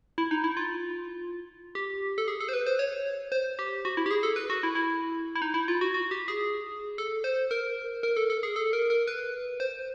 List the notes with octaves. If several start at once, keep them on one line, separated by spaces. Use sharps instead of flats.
E4
D#4
E4
F4
G4
A4
G#4
A4
C5
B4
C5
C#5
C5
G4
F#4
E4
G4
G#4
A4
B4
F#4
E4
E4
E4
D#4
E4
F4
F#4
F#4
G4
G#4
A4
C5
A#4
A#4
A4
A4
G#4
A4
A#4
A#4
B4
C5